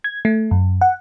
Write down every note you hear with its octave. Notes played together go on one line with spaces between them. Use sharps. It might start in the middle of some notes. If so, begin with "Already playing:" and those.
G#6
A3
F#2
F#5